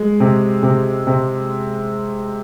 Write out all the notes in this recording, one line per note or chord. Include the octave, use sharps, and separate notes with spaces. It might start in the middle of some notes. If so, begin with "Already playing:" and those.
Already playing: G#3
C3
C3
C3